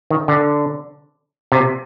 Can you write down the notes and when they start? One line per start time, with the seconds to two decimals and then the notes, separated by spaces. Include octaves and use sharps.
0.10 D#3
0.28 D3
1.52 C3